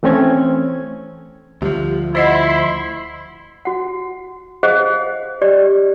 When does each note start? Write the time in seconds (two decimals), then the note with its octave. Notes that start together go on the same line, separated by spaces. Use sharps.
0.03 E3 A3 C4 C#4 G#6
1.62 D2 F3 G3 G4
2.15 E4 C5 D#5 F#5 B5 C6
3.65 F#4 F#5
4.63 G#4 C5 D#5 F5 F#5
5.42 G4 D5 D#5